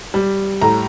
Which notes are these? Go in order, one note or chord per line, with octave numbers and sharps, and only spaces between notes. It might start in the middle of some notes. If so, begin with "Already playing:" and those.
G3
A2 A#5